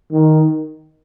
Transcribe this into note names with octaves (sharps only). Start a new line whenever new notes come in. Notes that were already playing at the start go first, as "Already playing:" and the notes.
D#3